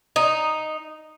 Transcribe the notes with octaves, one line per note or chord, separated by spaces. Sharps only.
D#4